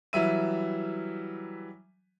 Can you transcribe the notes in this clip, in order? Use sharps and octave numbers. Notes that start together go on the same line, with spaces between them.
E3 F#3 G3 E5 D#7